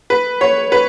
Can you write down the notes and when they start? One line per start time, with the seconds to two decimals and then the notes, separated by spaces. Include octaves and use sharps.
0.10 B4
0.41 C#5
0.72 B4